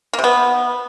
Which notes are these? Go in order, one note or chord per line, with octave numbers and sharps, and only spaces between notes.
A#3
C3
B3